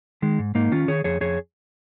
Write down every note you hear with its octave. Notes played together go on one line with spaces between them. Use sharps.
D#3 G#3
G#2
G#2 A#3 D#4
D#3 C#4 F4
D#3 G#4 C#5
F2 G#4 C#5
F2 G#4 C#5